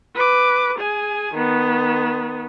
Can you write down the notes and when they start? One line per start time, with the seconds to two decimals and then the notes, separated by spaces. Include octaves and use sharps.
0.15 B4 D6
0.78 G#4 G#5
1.34 D#3 B3